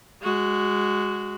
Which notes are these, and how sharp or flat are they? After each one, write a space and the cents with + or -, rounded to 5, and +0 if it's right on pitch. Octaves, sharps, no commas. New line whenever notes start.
G#3 -10 F#4 +0